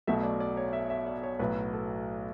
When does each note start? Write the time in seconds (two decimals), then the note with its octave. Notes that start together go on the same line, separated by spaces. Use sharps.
0.07 B1 B2 F#3 A3 E5
0.23 D5
0.40 D5
0.57 C#5
0.73 E5
0.90 E5
1.06 D5
1.23 C#5
1.39 B1 A2 F#3 B4
1.73 A4